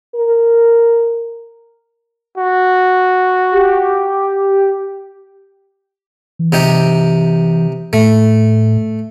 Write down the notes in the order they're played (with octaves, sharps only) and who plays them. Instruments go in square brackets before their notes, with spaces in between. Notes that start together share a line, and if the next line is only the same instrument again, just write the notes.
[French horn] A#4
[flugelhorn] F#4
[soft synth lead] G4
[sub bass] E3
[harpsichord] C3 D#4 G4
[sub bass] A2 [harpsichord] A3